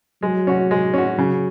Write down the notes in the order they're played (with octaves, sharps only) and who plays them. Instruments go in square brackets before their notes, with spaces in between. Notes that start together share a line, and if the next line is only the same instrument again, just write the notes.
[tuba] F#3 [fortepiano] G#3
[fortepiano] C#4 F#4
G#3
C#4 F#4
[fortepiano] C#3 [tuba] F#3